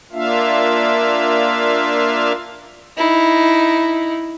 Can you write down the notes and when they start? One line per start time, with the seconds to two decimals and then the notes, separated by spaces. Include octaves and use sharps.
0.12 A#3 D4 F4 E5 F5
2.97 D#4 E4